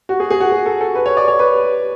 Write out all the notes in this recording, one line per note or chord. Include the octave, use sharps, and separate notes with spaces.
F#4
G#4
G#4
F#4
G#4
A4
A4
B4
C#5
D5
C#5
B4